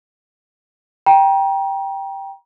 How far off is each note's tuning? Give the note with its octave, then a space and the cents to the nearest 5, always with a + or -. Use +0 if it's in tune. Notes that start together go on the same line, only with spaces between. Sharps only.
G5 +0 A#5 +30